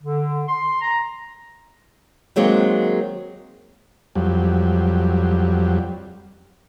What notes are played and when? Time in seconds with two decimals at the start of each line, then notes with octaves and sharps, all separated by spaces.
0.01 D3
0.47 C6
0.81 A#5
2.36 D#3 F#3 G#3 A#3 C4
4.15 F2 F#3 G3